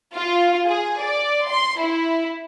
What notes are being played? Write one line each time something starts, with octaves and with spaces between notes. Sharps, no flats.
F4
G#4
D5
C6
E4